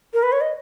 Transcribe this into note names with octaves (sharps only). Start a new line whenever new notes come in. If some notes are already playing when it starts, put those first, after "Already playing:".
A#4
B4
C#5
D#5